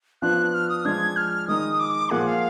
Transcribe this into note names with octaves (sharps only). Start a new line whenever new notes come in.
F3 B3 D4 F4 F#6
F6
D#6
F3 G#3 D4 G#6
F6
D#3 G#3 D#4 D#6
D6
A#2 F3 A#3 F4 G#4 F#5
F5